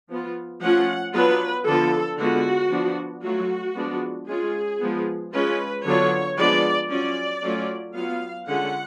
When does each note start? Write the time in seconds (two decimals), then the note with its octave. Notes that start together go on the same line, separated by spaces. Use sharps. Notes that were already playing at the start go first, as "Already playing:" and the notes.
0.09 F3 B3 F4
0.62 F3 A3 C#4 F4 F#5
1.14 F#3 B3 D4 F4 B4
1.66 D3 F3 B3 F4 A4
2.18 D3 G#3 B3 F4 F#4
2.71 F3 B3 D4
3.24 F#3 A3 F4 F#4
3.76 F3 G#3 B3 D4 F4
4.28 G#3 C#4 F4 G#4
4.81 F3 G#3 B3
5.33 G#3 C#4 F4 B4
5.85 D3 F#3 B3 D4 F4 C#5
6.37 F3 G#3 B3 D4 D5
6.90 F#3 C#4 F4 D5
7.42 F#3 A3 C#4 F4
7.94 F#3 B3 F4 F5
8.47 D3 G#3 C#4 F4 F#5